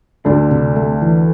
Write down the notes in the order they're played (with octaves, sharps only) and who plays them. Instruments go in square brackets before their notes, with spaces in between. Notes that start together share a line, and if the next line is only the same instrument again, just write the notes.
[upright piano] D2 D3 [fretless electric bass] D4
[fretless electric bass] C3
A3
E3